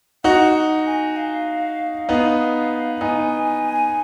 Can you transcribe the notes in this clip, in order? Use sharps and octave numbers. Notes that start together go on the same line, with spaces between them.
D#4 F#4 F#5
G#5
F5
B3 D#4
B3 D#4 G#5